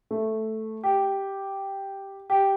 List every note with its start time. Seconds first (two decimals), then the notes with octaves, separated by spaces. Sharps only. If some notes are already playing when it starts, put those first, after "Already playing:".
0.11 A3
0.83 G4
2.30 G4